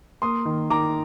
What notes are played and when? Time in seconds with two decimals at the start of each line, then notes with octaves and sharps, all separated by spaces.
0.22 A#3 C6 D#6
0.45 D#3
0.70 D#3 A#5 D6